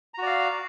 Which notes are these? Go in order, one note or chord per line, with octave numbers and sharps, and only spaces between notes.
F#4 D5 F5 A#5